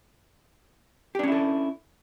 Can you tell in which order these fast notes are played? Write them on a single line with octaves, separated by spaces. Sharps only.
G4 D4 C#4 E4 A4